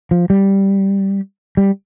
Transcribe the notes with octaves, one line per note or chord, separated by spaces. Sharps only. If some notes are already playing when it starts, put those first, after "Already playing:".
F3
G3
G3